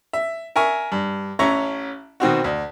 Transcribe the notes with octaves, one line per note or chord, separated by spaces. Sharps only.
E5
A#4 E5 G#5 C#6
G2
A1 C#4 E5 A#5 C#6
B2 D#3 C4 F#4
D2